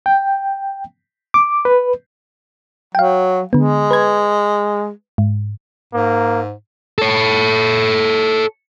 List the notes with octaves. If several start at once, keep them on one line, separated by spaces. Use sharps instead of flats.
G5
D6
B4
F#3 F5 G5
D3 G#3 B3
B4 G#6
G#2
G#2 A#3
A4 C#5